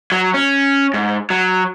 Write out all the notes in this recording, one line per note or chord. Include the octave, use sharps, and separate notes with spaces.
F#3
C#4
G#2
F#3